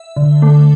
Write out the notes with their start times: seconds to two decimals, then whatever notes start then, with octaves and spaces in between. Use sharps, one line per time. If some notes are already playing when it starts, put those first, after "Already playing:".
Already playing: E5
0.16 D3
0.42 A3 D4